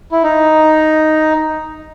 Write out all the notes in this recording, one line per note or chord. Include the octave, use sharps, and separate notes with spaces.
E4
D#4